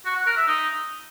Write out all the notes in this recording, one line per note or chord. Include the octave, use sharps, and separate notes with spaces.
F#4
F#5
A#4
E5
D#4